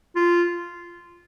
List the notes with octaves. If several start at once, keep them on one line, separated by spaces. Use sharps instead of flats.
F4